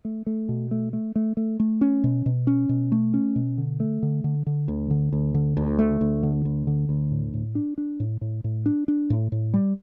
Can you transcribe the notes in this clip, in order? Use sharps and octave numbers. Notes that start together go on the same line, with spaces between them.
A3
A3
B2
A3
A3
A3
A3
A3
C#4
B2
B2
C#4
B2
A3
C#4
B2
D3
A3
D3
D3
D3
D2
D3
D2
D3
D2
A3
D2
D3
D2
D3
D2
A2
A2
D4
D4
A2
A2
A2
D4
D4
A2
A2
G3